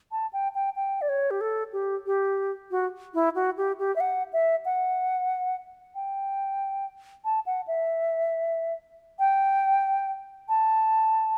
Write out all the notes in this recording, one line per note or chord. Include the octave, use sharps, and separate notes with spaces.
A5
G5
G5
G5
D5
C#5
G4
A4
G4
G4
F#4
E4
F#4
G4
G4
E5
F#5
E5
F#5
G5
A5
F#5
E5
G5
A5